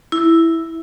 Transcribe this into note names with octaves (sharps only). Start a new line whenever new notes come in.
E4